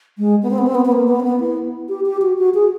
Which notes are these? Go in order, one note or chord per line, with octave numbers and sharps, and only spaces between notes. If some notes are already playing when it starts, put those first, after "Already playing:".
G#3
B3
C4
B3
C4
B3
B3
A#3
B3
C4
B3
E4
G4
G4
F#4
F#4
G#4